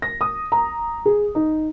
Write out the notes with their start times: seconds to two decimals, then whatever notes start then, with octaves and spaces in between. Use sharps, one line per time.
0.02 A#6
0.21 D#6
0.52 A#5
1.05 G#4
1.35 D#4